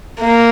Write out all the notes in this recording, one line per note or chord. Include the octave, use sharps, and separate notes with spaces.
A#3